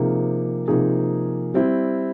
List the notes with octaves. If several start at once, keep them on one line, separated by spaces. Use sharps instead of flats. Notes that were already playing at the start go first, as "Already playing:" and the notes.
Already playing: C3 F3 A#3 D#4 G#4
C3 F3 A#3 D#4 G#4
G3 C4 E4